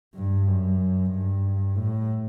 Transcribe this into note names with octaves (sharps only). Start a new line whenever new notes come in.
G2
F#2
G2
A2